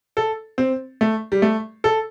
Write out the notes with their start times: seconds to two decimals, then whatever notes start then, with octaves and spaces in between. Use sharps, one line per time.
0.17 A4
0.58 C4
1.01 A3
1.32 G3
1.42 A3
1.84 A4